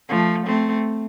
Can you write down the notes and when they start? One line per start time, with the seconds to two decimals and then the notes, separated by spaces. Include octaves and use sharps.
0.09 F3 A3
0.46 A3 C4